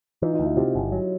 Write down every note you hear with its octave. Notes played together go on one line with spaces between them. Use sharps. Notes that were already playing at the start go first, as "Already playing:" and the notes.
E3 D#4 F4
D#4 F4
D2
E4 F#4
C3 F4 G4
G1
F#3